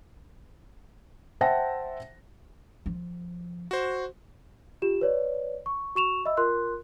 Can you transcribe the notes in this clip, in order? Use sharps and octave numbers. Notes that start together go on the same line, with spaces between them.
C5 E5 F#5 G5 A5 A#6
F3
F#4 C5
F4 G4 E7
B4 C#5 D5
C#6
F#4 C#6 E7 F7
D#5 E5 B5 E6
F4 A#4 C6 F#6